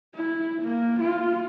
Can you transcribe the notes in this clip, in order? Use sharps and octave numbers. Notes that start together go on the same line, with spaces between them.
E4
A#3
F4